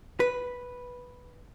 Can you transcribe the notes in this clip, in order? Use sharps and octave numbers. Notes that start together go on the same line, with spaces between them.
B4